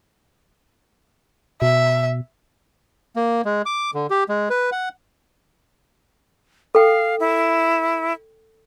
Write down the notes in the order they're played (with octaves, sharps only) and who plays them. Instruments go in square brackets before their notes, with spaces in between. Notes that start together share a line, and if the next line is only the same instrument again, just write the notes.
[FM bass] B2 [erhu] E5
[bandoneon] A#3
G#3
D6
D3
G4
G#3
B4
F#5
[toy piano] A4 G5 [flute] F5
[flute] E4